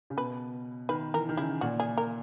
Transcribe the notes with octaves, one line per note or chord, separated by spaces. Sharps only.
C#3
B2 B4
D#3 B4
E3 A#4
D#3
C#3 E4
A#2 F#4
G#4
A#4